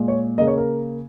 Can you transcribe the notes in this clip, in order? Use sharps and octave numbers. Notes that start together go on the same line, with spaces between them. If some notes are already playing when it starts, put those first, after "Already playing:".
Already playing: A#2 G#3
C#5
C#3 A#3 D#5
C#5
A#4